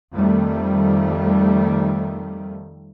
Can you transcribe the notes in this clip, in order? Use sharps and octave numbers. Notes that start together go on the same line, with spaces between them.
F2 D#3 G3 A3